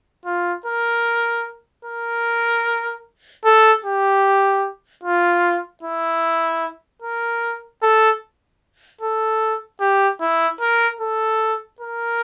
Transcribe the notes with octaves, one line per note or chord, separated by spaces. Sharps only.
F4
A#4
A#4
A4
G4
F4
E4
A#4
A4
A4
G4
E4
A#4
A4
A#4